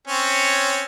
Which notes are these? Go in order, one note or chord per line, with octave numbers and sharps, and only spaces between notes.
C4 C#4 C#5